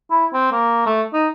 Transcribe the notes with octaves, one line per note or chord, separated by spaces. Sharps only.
E4
C4
A#3
A3
D#4